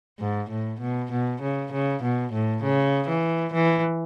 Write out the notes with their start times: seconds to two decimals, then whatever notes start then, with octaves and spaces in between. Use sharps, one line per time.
0.20 G#2
0.50 A2
0.80 B2
1.12 B2
1.42 C#3
1.72 C#3
2.03 B2
2.32 A2
2.63 C#3
3.08 E3
3.53 E3